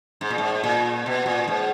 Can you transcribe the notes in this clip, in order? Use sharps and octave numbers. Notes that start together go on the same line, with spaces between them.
G#2
A#2
G#2
A#2
B2
A#2
G#2